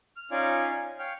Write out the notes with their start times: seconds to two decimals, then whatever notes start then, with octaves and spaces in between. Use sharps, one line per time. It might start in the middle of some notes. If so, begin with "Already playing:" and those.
0.16 F6
0.31 C#4 D#4 F4 D5 G#5
0.71 G#5
0.99 C#5 F5 G5 F6